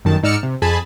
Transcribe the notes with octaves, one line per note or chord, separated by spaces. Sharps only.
G1 F#2 D#3 A5
G#2 D#4 D5 E6 F6 C#7
C3
F2 G#4 G#5 A5 B5